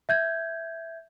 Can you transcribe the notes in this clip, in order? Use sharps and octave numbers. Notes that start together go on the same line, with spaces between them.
E5 G6 G#6